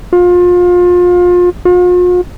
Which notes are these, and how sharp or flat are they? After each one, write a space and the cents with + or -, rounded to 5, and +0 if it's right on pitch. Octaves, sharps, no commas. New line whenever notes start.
F4 +30
F4 +45